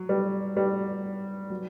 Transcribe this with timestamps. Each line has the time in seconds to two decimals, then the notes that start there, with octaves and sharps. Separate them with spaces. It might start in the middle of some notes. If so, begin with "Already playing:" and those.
Already playing: F#3
0.09 G3
0.57 G3
1.50 F#3